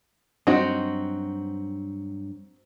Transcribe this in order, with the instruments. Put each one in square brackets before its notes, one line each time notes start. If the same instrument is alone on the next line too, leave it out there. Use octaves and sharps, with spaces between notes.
[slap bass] G2 F#3 [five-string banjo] C4 D#4 F#4